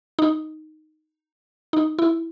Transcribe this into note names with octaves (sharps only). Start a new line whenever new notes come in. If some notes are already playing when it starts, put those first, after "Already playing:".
D#4
D#4
E4